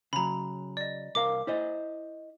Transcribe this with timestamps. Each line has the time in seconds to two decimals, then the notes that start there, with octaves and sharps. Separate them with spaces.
0.13 C#3 F#3 A#5 B5
0.77 D5 D#5
1.15 C2 A#4 F5 D6
1.47 E4 C5 D#5